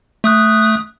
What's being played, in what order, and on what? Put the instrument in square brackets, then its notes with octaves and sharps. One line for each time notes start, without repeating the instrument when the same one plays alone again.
[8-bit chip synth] A3 D#6 F#6